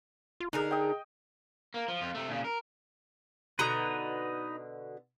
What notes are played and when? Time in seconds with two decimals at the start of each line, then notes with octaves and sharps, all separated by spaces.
0.40 F4
0.53 D3 D#4 G#4 A#4
0.71 D#5 G5
1.74 A#3
1.88 F3
2.01 F2 F4
2.15 C3 A3
2.29 A#2 C#3
2.44 A#4
3.59 B2 D3 D#4 B4 A#5